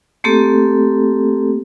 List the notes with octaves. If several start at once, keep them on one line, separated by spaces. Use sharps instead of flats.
A3 A#3 C4 G4 A4